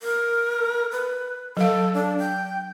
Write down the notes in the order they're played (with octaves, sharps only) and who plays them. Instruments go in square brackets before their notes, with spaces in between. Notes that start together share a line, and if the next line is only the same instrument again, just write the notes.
[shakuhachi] A#4
B4
[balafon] F#3 F5 [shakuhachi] A4
[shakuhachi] D4
G5